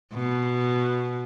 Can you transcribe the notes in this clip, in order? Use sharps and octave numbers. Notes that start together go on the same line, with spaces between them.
B2